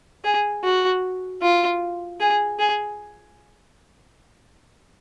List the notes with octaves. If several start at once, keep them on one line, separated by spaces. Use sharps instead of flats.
G#4
F#4
F4
G#4
G#4